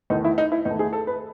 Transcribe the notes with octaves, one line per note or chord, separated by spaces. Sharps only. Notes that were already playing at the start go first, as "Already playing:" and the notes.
E2 D#3 A3 D#4
E4
D#4
E4
E2 D#3 A3 D#4
G#4
A4
B4